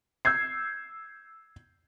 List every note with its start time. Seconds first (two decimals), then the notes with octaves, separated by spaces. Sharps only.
0.25 E6 G6 G#6 C7